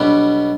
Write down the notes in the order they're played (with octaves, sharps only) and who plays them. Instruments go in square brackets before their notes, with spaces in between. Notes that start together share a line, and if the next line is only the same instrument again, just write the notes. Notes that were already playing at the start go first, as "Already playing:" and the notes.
Already playing: [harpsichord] B1 B2 G3 B3 [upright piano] D4